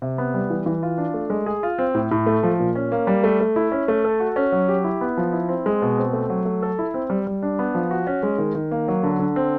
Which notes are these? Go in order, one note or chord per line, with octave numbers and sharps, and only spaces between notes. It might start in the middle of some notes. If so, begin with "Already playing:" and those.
C3
B3
G3
E3
E3
F4
D4
A3
G#3
G#4
F4
C4
A2
A2
A3
F3
A#2
C#4
A#3
G3
A3
A3
E4
C#4
A3
A4
F#4
C#4
F#3
G4
E4
B3
F3
E4
C4
G#3
B2
C4
A3
F#3
A3
A4
E4
C4
G3
G3
D4
B3
F3
F#4
C#4
G#3
D#3
D#3
A#3
F#3
D3
D3
C4